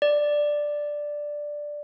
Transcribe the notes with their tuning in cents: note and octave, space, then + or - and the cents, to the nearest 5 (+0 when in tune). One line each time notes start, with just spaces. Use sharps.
D5 +5